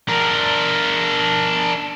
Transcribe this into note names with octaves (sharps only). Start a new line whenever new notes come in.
D4 A#4